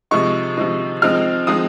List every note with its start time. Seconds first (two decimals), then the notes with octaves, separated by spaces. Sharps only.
0.11 C3 F3 G#3 D#4 C#6
0.57 C3 F3 G#3 D#4
1.02 F3 G#3 C4 D#4 F6
1.47 F3 G#3 C4 D#4 D#6